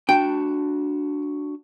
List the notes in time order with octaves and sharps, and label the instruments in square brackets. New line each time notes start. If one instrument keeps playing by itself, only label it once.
[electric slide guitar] D4 F#4 A5 [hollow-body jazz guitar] G5